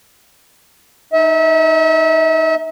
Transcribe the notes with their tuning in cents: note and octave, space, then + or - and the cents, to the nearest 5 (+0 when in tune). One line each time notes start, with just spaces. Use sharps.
D#4 +0 E5 -35